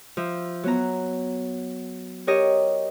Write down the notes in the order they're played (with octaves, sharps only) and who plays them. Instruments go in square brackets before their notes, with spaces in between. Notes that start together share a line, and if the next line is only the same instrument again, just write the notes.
[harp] F3 E5
F#3 B3 A#5
G4 A#4 C#5 D#5